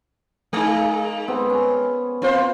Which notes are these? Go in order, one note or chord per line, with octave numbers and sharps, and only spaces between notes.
G#3 D#4 G#4 A#4
G3 B3 C4
C#4
C4 F4 C5